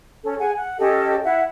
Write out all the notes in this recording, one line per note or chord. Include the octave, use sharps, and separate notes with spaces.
C#4 A4
G#4 F#5 G#5
F#5
C#4 G4 A4 D#5
E4 E5 F#5